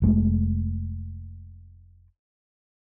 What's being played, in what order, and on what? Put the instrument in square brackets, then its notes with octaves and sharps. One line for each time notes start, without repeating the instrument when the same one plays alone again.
[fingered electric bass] F1 G#3 A3